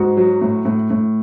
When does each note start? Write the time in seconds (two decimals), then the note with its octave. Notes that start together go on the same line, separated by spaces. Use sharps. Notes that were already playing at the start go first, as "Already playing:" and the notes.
Already playing: G#2 F#4
0.17 F#3
0.41 A2
0.65 A2
0.90 A2